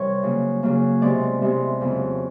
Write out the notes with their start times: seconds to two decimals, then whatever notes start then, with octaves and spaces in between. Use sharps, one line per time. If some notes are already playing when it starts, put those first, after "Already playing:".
Already playing: C3 E3 G3 A#4 C#5
0.23 C#3 F#3 A#3
0.63 C#3 F#3 A#3
1.02 C3 E3 G#3 B3 D5
1.42 C3 E3 G#3 B3
1.81 F2 C#3 F#3 B3